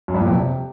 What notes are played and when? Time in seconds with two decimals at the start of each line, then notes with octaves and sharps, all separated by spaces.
0.08 F#2
0.14 G2
0.20 A#2
0.26 F2
0.33 C3